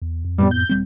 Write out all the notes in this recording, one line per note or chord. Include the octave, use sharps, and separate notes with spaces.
E2
F2
F#2 A2 G3 B3
G6
D#1 G3 C4